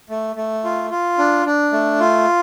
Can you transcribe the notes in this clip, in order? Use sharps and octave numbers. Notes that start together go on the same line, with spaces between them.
A3
A3
F4
F4
D4
D4
A3
F4